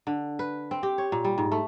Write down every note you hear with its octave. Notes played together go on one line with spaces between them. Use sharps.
D3
B4
C4
G4
C#5
A#2
G3
G#2
A3